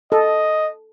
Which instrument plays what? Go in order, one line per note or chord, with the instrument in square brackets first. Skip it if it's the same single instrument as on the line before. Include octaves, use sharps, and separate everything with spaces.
[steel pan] A4 [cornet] D#5